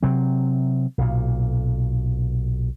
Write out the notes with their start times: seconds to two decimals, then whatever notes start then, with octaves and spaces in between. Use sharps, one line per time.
0.03 C3 F#3 C4
0.98 B1 A#2